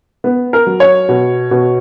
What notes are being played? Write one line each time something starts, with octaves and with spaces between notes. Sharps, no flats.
B3
A#4
F#3
C#5
B2
B2